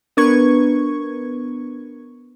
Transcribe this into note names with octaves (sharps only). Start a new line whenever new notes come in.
B3 D4 A#4 B4 C#6 G#6